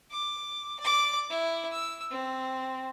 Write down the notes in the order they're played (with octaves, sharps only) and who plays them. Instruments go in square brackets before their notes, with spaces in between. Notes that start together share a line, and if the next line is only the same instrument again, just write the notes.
[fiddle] D6
D5 D6
E4
E6
C4